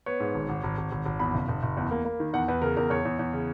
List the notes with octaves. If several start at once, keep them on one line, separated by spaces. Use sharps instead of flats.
B3 C#5
G#2
G#1
G#1
G#1
G#1
G#1
G#1
E2 B5
F#1
F#1
F#1
E2
A#3
A#3
D#3
E2 F#5
E2 B4
C#3 A#4
E2 A#4
E2 C#5
E2
E2
C#3